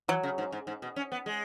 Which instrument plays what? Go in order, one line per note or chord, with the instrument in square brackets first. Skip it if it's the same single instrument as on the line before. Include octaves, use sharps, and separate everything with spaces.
[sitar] E3 [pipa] F#3
[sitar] C#3
G#2
G#2
G#2
B2
C#4
B3
G#3